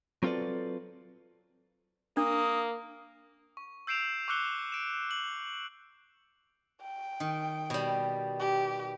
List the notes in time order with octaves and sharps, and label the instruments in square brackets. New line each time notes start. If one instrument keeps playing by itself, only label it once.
[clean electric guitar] F#3 C4 F4 A4 B4 D5
[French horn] A#3 [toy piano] D4 [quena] D#6
[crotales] C#6
E6 G6 C7 D7 E7 F7
C#6 D6 E6 F#6 C#7 G7
D7 E7
F#7
[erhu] G5
[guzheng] D#3
B2 G3
[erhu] G4